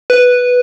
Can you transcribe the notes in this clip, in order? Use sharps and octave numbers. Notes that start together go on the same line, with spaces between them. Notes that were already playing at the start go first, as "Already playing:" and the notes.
B4